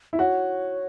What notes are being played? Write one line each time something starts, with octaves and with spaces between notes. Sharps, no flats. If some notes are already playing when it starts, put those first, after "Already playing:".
E4
F#4 C#5